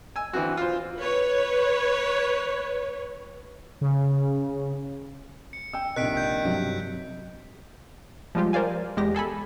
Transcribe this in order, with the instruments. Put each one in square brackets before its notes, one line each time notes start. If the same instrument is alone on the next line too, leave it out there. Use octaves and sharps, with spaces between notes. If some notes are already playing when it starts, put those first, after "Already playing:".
[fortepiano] G#5 E6
D3 E3 B3 C4 F#4
F4 C5
[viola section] B4 C#5
[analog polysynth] C#3
[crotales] C#7
[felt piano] G5 E6
[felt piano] A#1 C3 [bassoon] D#3 [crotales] F#6 B6 D7
[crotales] G6
[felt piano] G2 C3 F#3
[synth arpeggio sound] F3 G3 G#3 F4 G4
A#4 C5 D5 F5 G#5
E2 G#3 G4 A#6
G#4 A4 G#5 B5